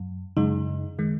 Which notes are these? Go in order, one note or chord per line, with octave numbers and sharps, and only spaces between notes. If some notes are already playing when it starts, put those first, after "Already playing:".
Already playing: F#2
F#2 C#3 G#3 D#4
D#3 G#3